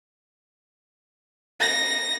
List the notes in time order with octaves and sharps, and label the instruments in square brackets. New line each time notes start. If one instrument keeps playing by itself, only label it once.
[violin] A#6